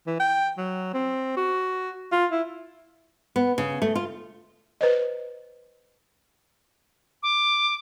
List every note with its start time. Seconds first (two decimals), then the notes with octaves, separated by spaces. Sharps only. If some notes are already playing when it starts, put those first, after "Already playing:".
0.07 E3
0.20 G5
0.58 F#3
0.94 C4
1.37 F#4
2.12 F4
2.32 E4
3.36 B3
3.58 C#3
3.82 A3
3.95 F4
4.81 B4 C5 D#5
7.23 D6